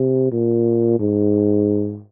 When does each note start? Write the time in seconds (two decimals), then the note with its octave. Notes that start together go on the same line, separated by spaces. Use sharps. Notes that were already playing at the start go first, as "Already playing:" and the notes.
Already playing: C3
0.31 A#2
0.99 G#2